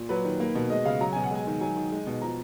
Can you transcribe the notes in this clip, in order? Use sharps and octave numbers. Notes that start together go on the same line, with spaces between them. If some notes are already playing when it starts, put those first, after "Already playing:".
Already playing: A#2
F#3 B4
D#3
A#3
B2
G#3 D#5
C#3 F5
F#3 A#5
B2 G#5
F#5
G#3 G#5
D#3
F#3 G#5
D#3
G#3
B2
F3 A#5